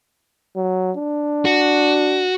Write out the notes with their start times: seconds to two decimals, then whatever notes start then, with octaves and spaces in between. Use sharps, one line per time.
0.56 F#3
0.97 D4
1.45 F#4